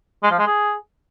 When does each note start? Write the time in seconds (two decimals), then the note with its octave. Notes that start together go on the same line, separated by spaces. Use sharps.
0.23 G#3
0.31 F3
0.39 G#3
0.47 G#4